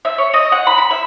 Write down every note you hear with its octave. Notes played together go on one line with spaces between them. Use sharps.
E5
C#5
D#5
F#5
B5
B5
E5